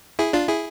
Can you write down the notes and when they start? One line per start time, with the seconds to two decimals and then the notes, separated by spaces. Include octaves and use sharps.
0.19 E4 G#4
0.33 D4 F4
0.48 E4 G#4